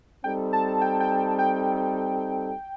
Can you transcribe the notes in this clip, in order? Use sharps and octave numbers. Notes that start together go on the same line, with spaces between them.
G3 C4 D#4 A4 G5
A5
G5
G5
G5